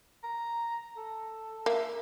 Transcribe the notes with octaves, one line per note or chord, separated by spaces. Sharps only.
A#5
A4
A#3 E5